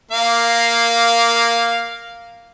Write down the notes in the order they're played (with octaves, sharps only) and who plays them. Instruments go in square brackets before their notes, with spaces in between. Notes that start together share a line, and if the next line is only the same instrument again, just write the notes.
[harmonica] A#3 F5